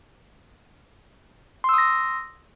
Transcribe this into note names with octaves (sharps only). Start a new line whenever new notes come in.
C6 D#6 E6 A#6